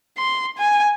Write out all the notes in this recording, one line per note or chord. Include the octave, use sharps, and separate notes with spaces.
C6
G#5